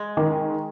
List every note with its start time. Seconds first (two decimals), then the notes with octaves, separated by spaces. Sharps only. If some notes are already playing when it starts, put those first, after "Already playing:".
Already playing: G#3
0.17 D#3